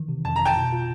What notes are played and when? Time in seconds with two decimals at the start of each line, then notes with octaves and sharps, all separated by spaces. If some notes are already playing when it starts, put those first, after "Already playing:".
Already playing: D#3 E3
0.09 C3
0.25 F2 A5
0.36 G1 A#5
0.46 G5 A5
0.56 B2
0.73 F4